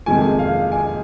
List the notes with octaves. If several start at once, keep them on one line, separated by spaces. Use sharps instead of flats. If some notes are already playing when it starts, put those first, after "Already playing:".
F2 C3 D#3 G#3 G#5
F5
G#5